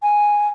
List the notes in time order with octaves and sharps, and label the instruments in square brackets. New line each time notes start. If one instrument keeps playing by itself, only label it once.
[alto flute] G#5